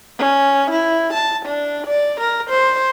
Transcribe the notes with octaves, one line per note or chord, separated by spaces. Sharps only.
C#4
E4
A5
D4
D5
A#4
C5